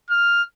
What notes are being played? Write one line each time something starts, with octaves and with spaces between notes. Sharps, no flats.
F6